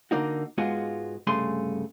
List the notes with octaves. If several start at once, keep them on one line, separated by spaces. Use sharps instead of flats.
D3 A#3 D#4 F#4
G#2 G#3 B3 F4 F#4 G#4
C2 G2 C#3 A3 G#4 C6